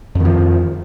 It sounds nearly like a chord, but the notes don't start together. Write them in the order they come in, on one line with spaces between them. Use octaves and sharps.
F2 D#3 F3